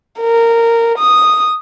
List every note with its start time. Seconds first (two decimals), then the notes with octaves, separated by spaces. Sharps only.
0.20 A#4
0.98 D#6